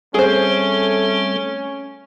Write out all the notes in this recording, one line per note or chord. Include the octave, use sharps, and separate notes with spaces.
G3 A3 C4 C#4 G#4 A4 C5